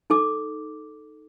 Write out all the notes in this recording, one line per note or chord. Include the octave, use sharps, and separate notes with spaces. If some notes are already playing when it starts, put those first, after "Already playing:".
D#4 A4 D6